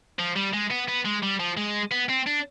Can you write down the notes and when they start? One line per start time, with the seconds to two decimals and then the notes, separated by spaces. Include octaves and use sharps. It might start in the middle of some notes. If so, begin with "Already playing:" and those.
0.19 F3
0.36 G3
0.53 G#3
0.70 B3
0.88 B3
1.05 G#3
1.23 G3
1.39 F3
1.57 G#3
1.91 B3
2.09 C4
2.27 D4